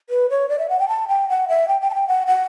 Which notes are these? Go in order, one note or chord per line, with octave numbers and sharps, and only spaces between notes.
B4
C#5
D5
E5
F#5
G5
A5
G5
F#5
E5
G5
G5
A5
G5
F#5
F#5